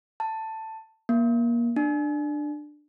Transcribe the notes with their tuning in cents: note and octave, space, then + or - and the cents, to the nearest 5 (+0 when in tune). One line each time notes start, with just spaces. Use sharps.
A5 +10
A#3 +25
D4 +15